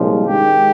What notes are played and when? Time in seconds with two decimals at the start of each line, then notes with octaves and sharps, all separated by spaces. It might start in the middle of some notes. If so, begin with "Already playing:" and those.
Already playing: C2 A#2 F3 G#3 C#4
0.26 G#2 D#3 G#3 G4